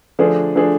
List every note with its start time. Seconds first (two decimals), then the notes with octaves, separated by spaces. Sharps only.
0.19 D3 F3 A3 D4 G#4
0.55 D3 F3 A3 D4 G#4